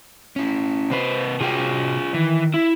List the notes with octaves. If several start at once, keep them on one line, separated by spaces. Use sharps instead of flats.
C#4 E4
C3 B4 C5
C3 F4 F#4 G#4 G5
D#3 E3
E4